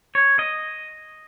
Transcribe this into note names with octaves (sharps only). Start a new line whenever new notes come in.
C#5
D#5